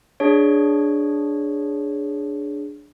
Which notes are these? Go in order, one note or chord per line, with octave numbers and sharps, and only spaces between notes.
D4 G#4 C#5